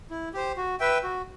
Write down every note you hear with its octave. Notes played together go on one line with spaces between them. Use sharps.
E4
G4 C5
F#4
B4 E5 G5
F#4